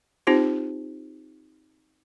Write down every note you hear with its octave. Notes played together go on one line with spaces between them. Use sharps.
C4 D#4 F4 G4 C5